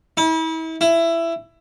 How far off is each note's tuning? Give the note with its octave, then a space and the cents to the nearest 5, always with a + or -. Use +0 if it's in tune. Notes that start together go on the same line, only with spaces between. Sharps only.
E4 -40
E4 +15